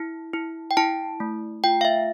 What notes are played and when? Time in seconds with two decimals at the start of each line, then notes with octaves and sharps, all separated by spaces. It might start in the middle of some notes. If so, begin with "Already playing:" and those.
Already playing: E4
0.34 E4
0.71 G5
0.77 E4 A5
1.20 A3
1.64 F4 G5
1.81 F5
1.85 E5